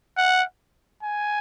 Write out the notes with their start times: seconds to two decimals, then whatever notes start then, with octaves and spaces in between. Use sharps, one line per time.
0.17 F#5
1.03 G#5